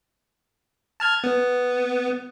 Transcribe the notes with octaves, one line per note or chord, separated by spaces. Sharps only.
A5 F6 G#6
B3